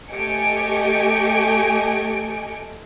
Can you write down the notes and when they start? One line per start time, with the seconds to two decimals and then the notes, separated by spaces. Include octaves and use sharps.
0.11 A3 G4 D#5 G#5 C#7 D7